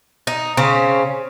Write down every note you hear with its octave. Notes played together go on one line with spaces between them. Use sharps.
D#4
C#3 C4 C#4